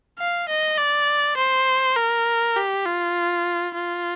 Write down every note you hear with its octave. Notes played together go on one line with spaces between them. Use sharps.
F5
D#5
D5
C5
A#4
G4
F4
F4